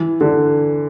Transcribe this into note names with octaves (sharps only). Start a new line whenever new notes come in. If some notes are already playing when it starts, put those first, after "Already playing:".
Already playing: E3
D3